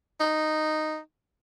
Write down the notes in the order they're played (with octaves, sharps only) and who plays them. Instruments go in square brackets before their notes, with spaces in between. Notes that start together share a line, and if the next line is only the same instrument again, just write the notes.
[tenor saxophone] D#4